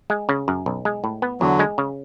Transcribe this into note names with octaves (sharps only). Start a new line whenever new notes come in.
G#3
C#3
F#2
B1
G#3
A2
B3
E2 D3 F#3
G#3
C#3